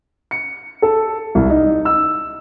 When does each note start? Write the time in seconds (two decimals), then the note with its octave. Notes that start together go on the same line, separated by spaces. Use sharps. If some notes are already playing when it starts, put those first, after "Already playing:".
0.31 C#7
0.82 A4
1.35 C2
1.50 D#4
1.85 E6